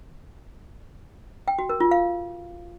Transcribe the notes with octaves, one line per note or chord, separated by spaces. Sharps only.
G5
F#4
A#4
F4
F5